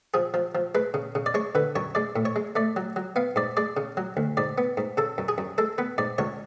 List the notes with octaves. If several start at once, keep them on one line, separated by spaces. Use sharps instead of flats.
F3 G#4
F3
F3
G#3 B4
C#3
C#3
D5
G#3 C#5
D3 B4
F#2 C#5
G#3 D5
A2
C#5
G#3
A3 D5
F#3
F#3
B3 F5
G#2 D5
G#3 D5
C#3
F#3
D2
G#2 D5
B3
G#2
C#3 A4
F#2
G#4
F#2
G#3 A4
B3 B4
G#2 D5
C#2 C#5